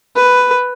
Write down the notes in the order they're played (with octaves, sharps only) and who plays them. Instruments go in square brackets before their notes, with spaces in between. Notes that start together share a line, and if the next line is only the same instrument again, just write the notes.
[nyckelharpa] B4